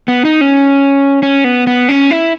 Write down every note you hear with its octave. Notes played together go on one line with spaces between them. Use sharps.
B3
D#4
C#4
C#4
B3
B3
C#4
E4